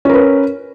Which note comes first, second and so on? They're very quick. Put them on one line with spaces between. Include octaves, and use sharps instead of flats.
C#4 A#4 B4